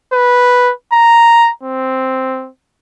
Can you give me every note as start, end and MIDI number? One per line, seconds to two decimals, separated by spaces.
0.13 0.72 71
0.93 1.50 82
1.63 2.49 60